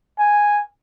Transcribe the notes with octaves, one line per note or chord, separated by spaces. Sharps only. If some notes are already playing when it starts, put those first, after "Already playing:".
G#5